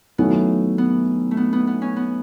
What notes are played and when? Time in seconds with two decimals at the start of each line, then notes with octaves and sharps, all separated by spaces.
0.18 D#3 F#3 A3 B3 C#4 E4
0.78 B3
1.31 A3
1.37 B3
1.53 B3
1.67 B3
1.82 C#4
1.96 B3